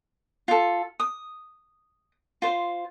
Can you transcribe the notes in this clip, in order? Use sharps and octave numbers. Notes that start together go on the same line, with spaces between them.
F4 A4
D#6
F4 C5